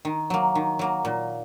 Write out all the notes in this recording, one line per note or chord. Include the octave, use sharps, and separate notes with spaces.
D#3
F#3 A#3
D#3
F#3 A#3
A#2